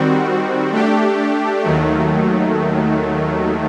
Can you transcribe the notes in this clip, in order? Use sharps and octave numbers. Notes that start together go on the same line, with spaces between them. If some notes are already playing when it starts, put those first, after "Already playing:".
Already playing: D#3 G3 C4 F#4
A3 D4 G4
D#2 D#3 F#3 A3